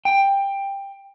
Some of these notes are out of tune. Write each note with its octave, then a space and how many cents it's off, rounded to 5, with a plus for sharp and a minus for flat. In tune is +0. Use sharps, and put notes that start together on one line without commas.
G5 +15